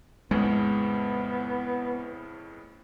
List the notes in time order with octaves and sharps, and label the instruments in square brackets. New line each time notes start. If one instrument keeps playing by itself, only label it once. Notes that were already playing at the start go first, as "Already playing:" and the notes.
[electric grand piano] F2 A2 C#3 [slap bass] G#3 [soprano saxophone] B3